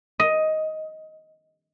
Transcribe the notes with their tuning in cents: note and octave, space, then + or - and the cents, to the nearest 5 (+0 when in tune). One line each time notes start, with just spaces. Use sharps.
D#5 +10